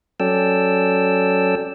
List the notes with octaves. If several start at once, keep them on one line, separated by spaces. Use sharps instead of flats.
F#3 C#4 A4 D5 G5 E6